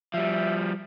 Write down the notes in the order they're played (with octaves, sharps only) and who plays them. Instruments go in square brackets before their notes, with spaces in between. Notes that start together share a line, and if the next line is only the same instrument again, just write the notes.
[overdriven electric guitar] F3 G3 [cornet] E5